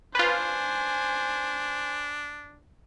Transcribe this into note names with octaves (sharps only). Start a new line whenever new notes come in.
D4 F4 B4 C5 G#5